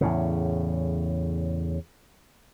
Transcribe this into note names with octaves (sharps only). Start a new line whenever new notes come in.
E2 A2 C#3